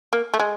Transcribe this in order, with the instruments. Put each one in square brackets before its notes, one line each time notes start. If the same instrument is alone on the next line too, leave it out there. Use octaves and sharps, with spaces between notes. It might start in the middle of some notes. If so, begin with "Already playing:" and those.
[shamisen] A#3
A3
G#3